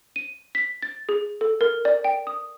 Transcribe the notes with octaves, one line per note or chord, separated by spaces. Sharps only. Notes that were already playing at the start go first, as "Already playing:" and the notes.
D#7
B6
A6
G#4
A4
A#4
D5
G5
D#6